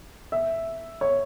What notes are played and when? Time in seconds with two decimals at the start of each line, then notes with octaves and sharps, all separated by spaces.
0.32 E5
1.01 C#5